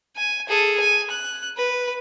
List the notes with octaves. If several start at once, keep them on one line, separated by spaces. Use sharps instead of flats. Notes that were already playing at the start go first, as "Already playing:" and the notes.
G#5
G#4 A4
G#5
F#6
B4